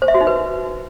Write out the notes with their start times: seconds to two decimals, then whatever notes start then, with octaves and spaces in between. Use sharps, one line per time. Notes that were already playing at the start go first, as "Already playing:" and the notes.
0.02 C5
0.08 E5
0.14 F#4
0.21 D#4
0.27 B4